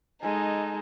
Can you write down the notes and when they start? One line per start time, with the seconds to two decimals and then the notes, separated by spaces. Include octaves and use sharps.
0.22 G#3 D#4 A4 G#5